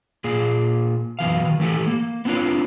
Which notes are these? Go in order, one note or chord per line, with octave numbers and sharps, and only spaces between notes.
A#2 A#3 G#4
F#2 B2 E3 F5
D#3
E3 A3 G4 A4
A#3
B3 C4 D4 F4 C#5